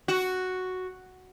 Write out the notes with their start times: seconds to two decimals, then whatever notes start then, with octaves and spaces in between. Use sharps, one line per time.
0.08 F#4